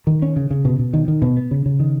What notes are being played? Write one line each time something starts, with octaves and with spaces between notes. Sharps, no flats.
D#3
C#4
C#3
C#3
B2
B2
D#3
D#3
B2
B3
C#3
C#3
D#3